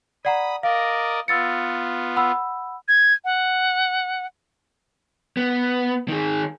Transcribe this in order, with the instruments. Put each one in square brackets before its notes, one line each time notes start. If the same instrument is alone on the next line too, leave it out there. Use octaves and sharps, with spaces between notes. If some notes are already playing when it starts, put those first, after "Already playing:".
[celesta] D5 F#5 A#5 [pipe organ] B5 D#6
[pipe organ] A#4 D5 D#5 [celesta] F5
[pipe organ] B3 F4 [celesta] E6 A6 C#7
[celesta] F#5 B5 E6
[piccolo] G#6
F#5
[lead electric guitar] B3
D#3 G#4